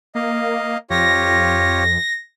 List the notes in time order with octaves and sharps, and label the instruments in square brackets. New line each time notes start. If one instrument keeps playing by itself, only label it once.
[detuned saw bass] A#3 [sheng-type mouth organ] D#5 F5
[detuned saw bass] F2 [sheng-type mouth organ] F4 G4 C#5 [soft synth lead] A#6